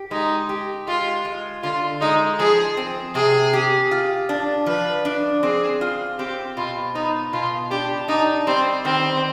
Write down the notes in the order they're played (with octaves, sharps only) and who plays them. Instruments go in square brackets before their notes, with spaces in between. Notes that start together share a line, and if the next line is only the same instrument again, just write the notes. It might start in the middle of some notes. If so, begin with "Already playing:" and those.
Already playing: [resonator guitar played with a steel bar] G4
[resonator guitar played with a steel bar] G#3 [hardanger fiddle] D#4
[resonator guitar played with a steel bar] G4
[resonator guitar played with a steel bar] G#3 [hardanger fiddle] F4
[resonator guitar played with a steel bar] G#3
[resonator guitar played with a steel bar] D3 [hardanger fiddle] F4
[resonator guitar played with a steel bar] G#3 [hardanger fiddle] D#4
[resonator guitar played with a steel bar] F3 [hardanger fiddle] G#4
[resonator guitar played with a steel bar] C4
[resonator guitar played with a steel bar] C3 [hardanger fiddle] G#4
[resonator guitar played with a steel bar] G4
F4
D4
[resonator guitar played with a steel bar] F3 [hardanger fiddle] B4
[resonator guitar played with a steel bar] D4
[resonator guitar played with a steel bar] C4 [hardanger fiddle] G#4
[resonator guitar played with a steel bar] F4
[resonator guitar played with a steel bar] C4 [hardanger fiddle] G4
[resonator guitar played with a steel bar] B2 [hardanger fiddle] F4
[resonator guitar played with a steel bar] B3 [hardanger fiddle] D#4
[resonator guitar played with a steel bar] B2 [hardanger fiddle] F4
[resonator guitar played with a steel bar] D4 [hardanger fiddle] G4
[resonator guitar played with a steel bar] D4 [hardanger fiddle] D#4
[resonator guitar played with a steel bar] G3 [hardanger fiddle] C4
[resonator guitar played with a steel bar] D#3 [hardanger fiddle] C4